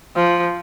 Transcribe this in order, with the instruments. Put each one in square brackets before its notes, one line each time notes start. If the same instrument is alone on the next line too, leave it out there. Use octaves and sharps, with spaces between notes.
[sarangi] F3